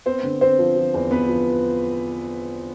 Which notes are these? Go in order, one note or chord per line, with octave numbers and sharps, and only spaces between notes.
B3 C4 C5
D3
B3 C4 C5
F3
F3
E2
B3 B4
F3